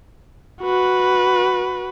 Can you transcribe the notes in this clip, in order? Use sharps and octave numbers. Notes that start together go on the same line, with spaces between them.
F#4 B4